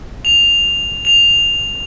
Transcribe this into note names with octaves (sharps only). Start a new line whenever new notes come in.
F7
F7